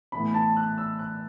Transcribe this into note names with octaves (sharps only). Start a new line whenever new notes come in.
A2 E3 B3 B5
A5
F#6
E6
F#6